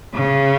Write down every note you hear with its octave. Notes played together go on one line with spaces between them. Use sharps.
C#3